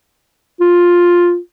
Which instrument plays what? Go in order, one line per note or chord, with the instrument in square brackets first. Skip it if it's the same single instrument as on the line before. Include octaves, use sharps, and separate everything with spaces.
[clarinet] F4